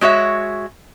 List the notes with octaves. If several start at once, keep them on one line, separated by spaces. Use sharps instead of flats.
G#3 F#4 C#5 E5